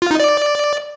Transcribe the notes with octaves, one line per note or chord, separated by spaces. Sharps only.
F4
D#4
D5